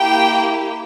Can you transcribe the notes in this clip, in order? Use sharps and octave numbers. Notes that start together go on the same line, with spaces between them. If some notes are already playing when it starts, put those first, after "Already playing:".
Already playing: A#3 E4 G4 G5